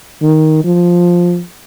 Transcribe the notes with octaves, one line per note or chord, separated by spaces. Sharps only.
D#3
F3